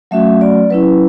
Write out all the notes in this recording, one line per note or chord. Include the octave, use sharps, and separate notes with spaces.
F#3 A3 C#4 F#4 E5
D5
F#3 C#4 E4 B4